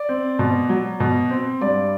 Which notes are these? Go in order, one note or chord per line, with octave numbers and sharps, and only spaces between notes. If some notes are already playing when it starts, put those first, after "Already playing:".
Already playing: D5
C4
B2
F#3
B2
C4
G2 D5